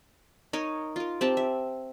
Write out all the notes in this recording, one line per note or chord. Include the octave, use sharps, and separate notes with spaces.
D#4 A#4 C#5 D#5
F4 A#4
C4 G4 A5
E5